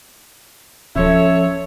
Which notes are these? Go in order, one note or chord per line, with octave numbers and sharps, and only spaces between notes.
D1 F3 C#4 A4 C#5 E5